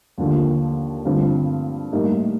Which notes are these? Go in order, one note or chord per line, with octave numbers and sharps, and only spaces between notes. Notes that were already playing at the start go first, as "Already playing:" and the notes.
D#2 D3 F3
G2 D3 F3 C4
A2 G3 A#3 D#4